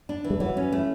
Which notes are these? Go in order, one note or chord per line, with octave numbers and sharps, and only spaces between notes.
D4
E3
G3
E3 F#3
C#4
A3